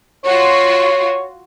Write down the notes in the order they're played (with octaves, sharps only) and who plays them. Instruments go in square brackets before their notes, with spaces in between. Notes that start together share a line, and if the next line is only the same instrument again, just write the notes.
[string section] F4 F#4 [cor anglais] C#5